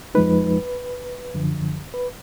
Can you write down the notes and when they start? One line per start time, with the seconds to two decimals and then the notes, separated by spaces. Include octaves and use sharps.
0.15 F2 F3 G#3 D#4 B4
1.34 F#2 D3 F3
1.94 B4